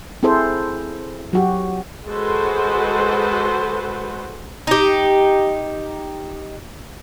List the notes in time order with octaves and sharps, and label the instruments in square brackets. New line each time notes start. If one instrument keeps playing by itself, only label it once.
[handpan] C4 E4 G#4 A4 C5
F#3 F#4 G4
[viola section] G#3 F#4 A4 B4 C5
[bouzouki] D#4 G4